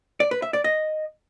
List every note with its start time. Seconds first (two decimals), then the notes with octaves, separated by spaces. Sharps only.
0.20 D5
0.31 B4
0.42 E5
0.53 D5
0.64 D#5